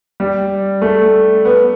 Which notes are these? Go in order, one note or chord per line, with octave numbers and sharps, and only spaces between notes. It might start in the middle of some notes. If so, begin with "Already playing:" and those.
G3
A3
B3